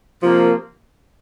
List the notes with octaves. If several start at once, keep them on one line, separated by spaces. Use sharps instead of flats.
C3 F3 A#3